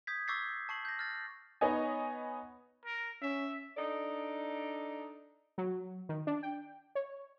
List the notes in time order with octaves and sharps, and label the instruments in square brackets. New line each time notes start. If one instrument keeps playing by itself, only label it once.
[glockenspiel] D#6 G6 G#6 B6
C#6 D6 E6 G6 A6 C7
A5 C#6 C7 F#7
G6 A#6
F6 A6
[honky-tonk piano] B3 D#4 C#5 D#5 G#5
[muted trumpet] A#4
[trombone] C#4 [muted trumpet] E5
[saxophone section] D4 D#4 A4 D5
[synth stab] F#3
D#3
D4
G5
C#5